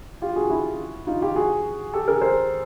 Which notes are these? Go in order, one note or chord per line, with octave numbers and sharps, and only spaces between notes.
F4 G4
F#4 G#4
E4 F#4
D#4 F4
F4 G4
F#4 G#4
G4 A4
G#4 A#4
A#4 C5